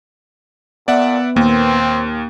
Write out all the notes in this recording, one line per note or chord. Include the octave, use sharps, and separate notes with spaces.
A#2 B3 D5 E5 F#5
D#2 A#3 C4